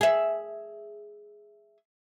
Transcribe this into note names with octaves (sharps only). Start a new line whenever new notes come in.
G#4 E5